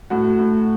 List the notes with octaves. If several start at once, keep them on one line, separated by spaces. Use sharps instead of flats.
A2 F#4
A2